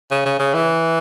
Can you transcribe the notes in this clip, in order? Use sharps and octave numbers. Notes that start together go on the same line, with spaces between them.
C#3
C#3
C#3
E3